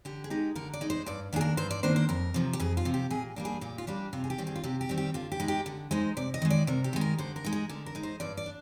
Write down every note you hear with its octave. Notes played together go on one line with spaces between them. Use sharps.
D3 G4
G#4
G#3 D#4 G4
D3 A#4
D5
G#3 D#4
C5
G2 D5
D#3 A#3 D4 G#4
A#4
G2 C5
D5
D#3 A#3 D4 C5
C5
F2 A#4
C3 F3
G4
F2 G#4
F4
C3 F3
G4
A#2 G#4
G3 A#3 D4
G#4
A#2 G4
F4
G3 A#3 D4 G4
C3 F4
G#4
G4
D#3 G3 C4
G#4
F4
C3 G4
G4
D#3 G3 C4
G4
D3 F4
G4
G#3 D#4
G4
D3
G#3 D#4 C5
C3 D5
D#5
D#3 G#3
D5
C3 A#4
G4
D#3 G#3
A#4
D3 C5
A#4
G#3 D#4
G#4
D3 A#4
A#4
G#3 D#4
C5
G2 D5
D5
D4